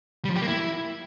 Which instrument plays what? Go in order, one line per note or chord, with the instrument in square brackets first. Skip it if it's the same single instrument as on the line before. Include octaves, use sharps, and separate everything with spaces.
[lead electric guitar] G3
F3
G4
A#3
E4